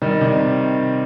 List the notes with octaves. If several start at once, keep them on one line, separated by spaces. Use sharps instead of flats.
D#3 G3
C3 D#3